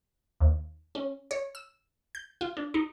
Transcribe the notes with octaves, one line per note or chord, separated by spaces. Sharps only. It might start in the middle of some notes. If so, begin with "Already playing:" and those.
D#2
C#4
C#5
E6
G6
F4
D4
D#4